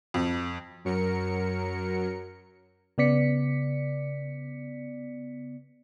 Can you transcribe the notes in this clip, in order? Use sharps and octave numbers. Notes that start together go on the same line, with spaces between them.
F2
F#2 F#3 A#4 C#7
C#3 B3 D5 B6 C#7